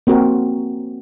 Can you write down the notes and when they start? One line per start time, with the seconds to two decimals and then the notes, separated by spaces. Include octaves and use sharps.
0.07 A#3 C4 F#4 A#4